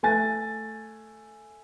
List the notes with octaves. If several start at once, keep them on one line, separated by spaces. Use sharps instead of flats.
A3 G#5 A6